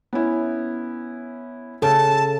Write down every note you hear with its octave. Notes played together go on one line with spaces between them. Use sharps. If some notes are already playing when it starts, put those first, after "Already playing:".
B3 C#4 E4
C#3 A4 A5